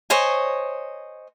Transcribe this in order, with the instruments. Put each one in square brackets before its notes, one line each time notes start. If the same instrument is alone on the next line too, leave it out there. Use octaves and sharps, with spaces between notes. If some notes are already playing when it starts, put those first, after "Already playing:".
[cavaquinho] C5 C#5 D#5 G#5